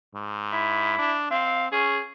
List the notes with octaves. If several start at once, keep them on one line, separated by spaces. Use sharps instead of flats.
G#2
E4
D4
C4 F5
C#4 G#4